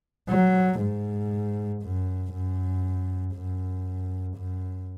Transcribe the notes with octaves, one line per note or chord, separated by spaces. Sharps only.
F#3
G#2
F#2
F#2
F#2
F#2